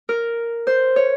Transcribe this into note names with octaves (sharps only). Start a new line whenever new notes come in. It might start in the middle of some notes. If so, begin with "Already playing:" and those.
A#4
C5
C#5